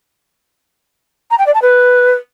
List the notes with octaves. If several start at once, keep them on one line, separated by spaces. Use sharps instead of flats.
A#5
G5
D5
A5
B4